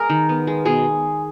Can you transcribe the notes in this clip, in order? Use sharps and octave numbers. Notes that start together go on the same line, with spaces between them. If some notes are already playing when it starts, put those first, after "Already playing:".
Already playing: G#3 G#4 A#4
D#3
B3
G#3
B2 G#4